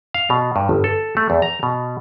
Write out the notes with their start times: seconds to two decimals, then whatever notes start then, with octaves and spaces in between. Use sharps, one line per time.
0.14 F5
0.30 B2
0.56 G2
0.69 G1
0.84 A4
1.17 A3
1.30 E2
1.42 A#5
1.63 B2